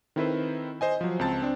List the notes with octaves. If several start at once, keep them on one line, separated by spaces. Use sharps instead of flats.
D#3 C4 E4 A4 B4 C5
C5 D#5 G#5
F3 F#3
C#2 C4 A5 A6
C4 D4